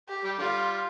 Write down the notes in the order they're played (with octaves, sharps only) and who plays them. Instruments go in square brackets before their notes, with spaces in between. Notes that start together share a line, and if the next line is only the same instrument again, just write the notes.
[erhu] G4
[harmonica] G3
[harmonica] D3 G3 [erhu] F4